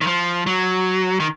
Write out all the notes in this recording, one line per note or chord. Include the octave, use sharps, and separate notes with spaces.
D#3
F3
F#3
D#3